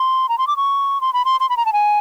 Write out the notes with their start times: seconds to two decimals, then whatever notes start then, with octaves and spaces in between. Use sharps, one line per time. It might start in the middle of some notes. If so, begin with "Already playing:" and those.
Already playing: C6
0.29 A#5
0.38 C6
0.47 D6
0.57 C#6
1.01 C6
1.13 B5
1.25 C6
1.40 C6
1.50 B5
1.57 A#5
1.66 A5
1.73 G#5